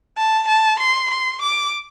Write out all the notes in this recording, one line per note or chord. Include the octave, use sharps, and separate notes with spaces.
A5
A5
C6
C6
D6